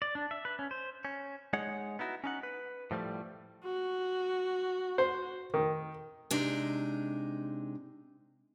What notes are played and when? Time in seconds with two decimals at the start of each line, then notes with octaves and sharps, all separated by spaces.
0.02 D5
0.15 D4
0.31 E5
0.45 B4
0.59 C#4
0.71 C5
1.05 C#4
1.53 G#3 D#4 C#5 F#5
1.99 B3 D#4 E4 F#4
2.24 C#4 D#4 F#5
2.43 B4
2.91 A2 F3 G3 A3
3.64 F#4
4.98 C5
5.54 D#3
6.31 C3 G#3 D4 D#4